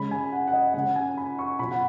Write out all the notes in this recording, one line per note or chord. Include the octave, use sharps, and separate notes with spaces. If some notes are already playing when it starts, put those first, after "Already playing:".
Already playing: C#3 G#3 B5
G#5
F#5
F#5
D#5
C#3 G#3 F#5
G#5
B5
C#6
B2 F#3 B5
F#5